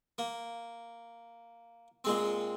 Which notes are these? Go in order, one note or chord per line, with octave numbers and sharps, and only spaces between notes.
A#3
A#2 G#3 C4